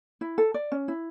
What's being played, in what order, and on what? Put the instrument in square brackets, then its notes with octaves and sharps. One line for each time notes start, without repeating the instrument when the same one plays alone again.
[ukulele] E4
A4
D5
C#4
E4